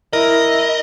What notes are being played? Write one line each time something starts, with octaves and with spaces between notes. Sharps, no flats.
E4 A#4 D#5